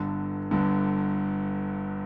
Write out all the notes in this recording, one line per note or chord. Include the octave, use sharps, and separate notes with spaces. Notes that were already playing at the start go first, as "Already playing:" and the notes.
Already playing: G1 G2 D3
G1 G2 D3